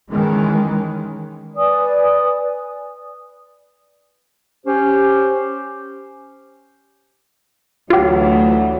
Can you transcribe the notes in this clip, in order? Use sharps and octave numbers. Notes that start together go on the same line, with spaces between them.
D#3 E3 G#3 C#4
B4 D5 G#5 D#6
C#4 G4 C5
D2 E3 F#3 F4 G4